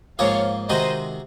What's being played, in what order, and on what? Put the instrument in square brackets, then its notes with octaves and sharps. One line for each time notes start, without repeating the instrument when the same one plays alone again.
[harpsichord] G#2 F3 A#3 F4 G#4 [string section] C#5 F5
[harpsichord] C3 D#3 G#3 D#4 F#4 [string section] C5 D#5